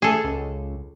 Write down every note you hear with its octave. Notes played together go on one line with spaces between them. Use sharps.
A2 G#4 A4
C#2